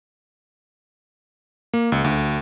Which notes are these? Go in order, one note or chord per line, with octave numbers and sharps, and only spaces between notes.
A#3
C#2
D2